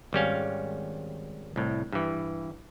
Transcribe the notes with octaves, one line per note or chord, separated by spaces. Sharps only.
G#1 G3 C#4 F5
C2 A2
G2 E3